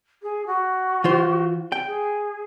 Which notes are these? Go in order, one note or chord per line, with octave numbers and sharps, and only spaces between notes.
G#4
F#4
E3 F4 C5
G5
G#4